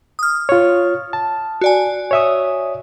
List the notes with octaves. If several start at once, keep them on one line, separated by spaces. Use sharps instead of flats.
D#6 F6
F4 C#5
A5
F#4 D5 G#5
C#5 E5 D#6